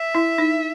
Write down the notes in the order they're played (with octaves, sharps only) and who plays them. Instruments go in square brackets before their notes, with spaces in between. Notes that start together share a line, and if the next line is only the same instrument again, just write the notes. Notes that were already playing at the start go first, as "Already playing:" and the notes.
Already playing: [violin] E5
[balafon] E4
D#4